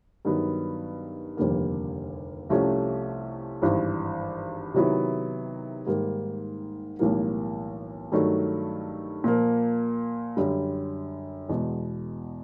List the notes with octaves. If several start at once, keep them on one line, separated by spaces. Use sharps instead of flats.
G2 D#3 F#3 B3
F1 D#2 D3 G3 A#3
C2 C3 F3 A3 C#4
G#1 G2 E3
C3 D#3 F#3 B3 E4
G#2 D#3 G3 A#3
B1 A2 E3 G3 A#3
G2 D#3 F#3 A3
A#2 F3 A#3
F#2 D3 G3
E2 B2 G#3